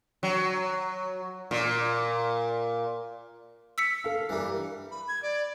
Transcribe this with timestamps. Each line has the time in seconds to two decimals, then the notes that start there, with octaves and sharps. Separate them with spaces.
0.23 F#3
1.51 A#2
3.78 E6 B6 C#7
4.04 A4 F5
4.29 G2 E3 G3 A#4
4.91 B5
5.08 G#6
5.22 D5